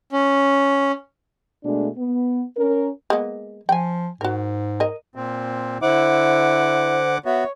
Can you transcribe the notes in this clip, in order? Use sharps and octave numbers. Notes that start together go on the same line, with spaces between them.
C#4
B2 G#3 A3 D4
B3
C#4 A#4
G#3 A#3 B3
F3 G5 G#5
G#2 F#4 A#4
A#4 D#5
A#2 C4
D3 E4 C5 F#5 D6
B3 F#4 C#5 E5